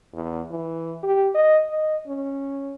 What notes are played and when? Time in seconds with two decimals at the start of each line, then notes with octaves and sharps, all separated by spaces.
0.13 E2
0.50 E3
1.03 G4
1.34 D#5
1.70 D#5
2.07 C#4